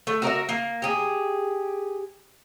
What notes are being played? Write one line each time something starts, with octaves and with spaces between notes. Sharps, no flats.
A3
F#4 A#4 D#5 E5
A#3
G4 G#4